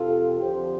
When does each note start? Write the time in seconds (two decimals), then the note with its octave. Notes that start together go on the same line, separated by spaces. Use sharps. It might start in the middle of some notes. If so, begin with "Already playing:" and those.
Already playing: F2 C3 F3 F4 A4
0.40 F2 D3 F3 G4 C5